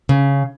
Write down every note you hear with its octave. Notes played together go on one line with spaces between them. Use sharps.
C#3